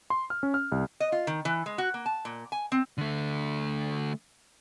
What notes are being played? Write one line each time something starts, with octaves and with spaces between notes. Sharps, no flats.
C6
F6
C#4
F6
C2
D#5
F4
D#3
E3
G#3
F#4
A#3
A5
A#2
G#5
C4
D3 A3